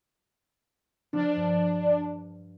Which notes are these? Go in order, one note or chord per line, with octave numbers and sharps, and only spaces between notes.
F3 D4
G2